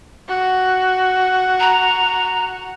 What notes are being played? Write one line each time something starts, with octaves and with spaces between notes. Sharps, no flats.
F#4
A#5